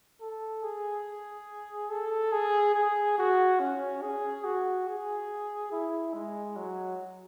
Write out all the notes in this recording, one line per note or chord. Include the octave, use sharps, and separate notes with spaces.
A4
G#4
A4
G#4
G#4
F#4
C#4
G#4
F#4
G#4
E4
G#3
F#3